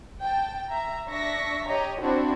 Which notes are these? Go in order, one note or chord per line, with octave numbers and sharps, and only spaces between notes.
G5 A5
E5 A#5
D4 E5 C#6 A#6 B6
G4 C#5 D#5 A#5
C4 D4 E4 F#4